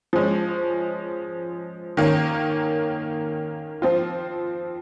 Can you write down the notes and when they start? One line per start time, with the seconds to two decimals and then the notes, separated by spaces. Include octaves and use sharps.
0.13 F3 G#3 C#4
1.97 D#3 A#3 C#4
3.82 F3 C4 F4